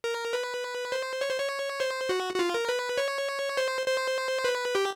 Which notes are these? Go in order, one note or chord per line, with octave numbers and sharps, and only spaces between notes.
A#4
B4
C5
C#5
C5
C#5
C5
F#4
F#4
F4
A#4
B4
C#5
C5
C5
B4
G4